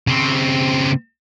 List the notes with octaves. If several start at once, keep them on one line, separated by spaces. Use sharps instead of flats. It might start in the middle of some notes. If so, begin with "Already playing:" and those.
C#3 C4